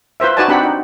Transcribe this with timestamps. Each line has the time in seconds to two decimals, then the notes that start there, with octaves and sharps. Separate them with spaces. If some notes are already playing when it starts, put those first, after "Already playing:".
0.20 F4 B4 C5 E5
0.37 D#4 F#4 B4 D5 G#5 A5
0.48 C4 D4 D#4 G4 F#5 B5
0.63 D#4